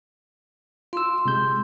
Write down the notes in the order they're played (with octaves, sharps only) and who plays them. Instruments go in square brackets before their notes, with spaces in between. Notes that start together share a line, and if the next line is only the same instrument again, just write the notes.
[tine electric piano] F4 E6 [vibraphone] C6
[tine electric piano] C3 G#3 G6